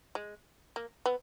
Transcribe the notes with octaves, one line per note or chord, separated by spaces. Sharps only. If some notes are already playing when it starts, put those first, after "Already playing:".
G#3
A#3
B3